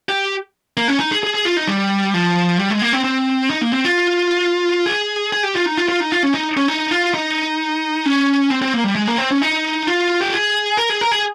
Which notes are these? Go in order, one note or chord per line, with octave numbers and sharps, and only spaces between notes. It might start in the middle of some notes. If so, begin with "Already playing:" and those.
G4
A#3
C#4
D#4
G#4
G#4
G#4
F4
D#4
G3
F3
G3
G#3
A#3
C4
C4
D#4
A#3
C4
F4
G#4
G#4
G4
F4
D#4
F4
F4
D#4
F4
C#4
D#4
C#4
D#4
F4
D#4
C#4
C4
C4
A#3
G3
G#3
A#3
C4
C#4
D#4
F4
G4
G#4
A#4
G#4
A#4
G#4